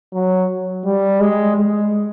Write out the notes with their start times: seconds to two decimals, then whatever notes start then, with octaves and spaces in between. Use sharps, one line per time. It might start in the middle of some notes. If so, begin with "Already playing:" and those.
0.14 F#3
0.85 G3
1.21 G#3
1.56 G#3